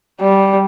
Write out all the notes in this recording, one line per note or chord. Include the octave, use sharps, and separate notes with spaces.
G3